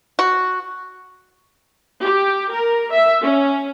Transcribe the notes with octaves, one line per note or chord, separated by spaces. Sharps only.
F#4
G4
A#4
E5
C#4